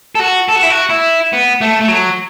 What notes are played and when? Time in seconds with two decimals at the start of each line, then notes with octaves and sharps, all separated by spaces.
0.15 A4
0.19 F#4
0.48 A4
0.55 F#4
0.63 E4
0.70 F#4
0.90 E4
1.33 B3
1.61 A3
1.81 A3
1.88 F#3